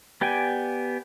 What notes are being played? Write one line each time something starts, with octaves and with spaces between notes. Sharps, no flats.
B3 G4 D5 G5 G#5